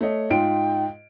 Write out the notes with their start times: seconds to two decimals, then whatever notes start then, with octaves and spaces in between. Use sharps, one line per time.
0.01 A3 C#5 D#5
0.30 G#2 F4 G5 D7